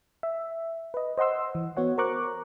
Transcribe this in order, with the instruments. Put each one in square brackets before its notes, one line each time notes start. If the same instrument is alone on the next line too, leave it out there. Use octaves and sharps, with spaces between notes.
[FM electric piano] E5
B4 D#5
C5 D#5 F#5 C6 E6
E3
B3 F#4 C#5 F#5
A#4 C5 A#5 C#6 D6 F#6